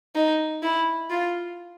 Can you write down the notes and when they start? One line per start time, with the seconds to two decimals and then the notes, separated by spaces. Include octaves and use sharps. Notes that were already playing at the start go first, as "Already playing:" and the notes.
0.15 D#4
0.63 E4
1.10 F4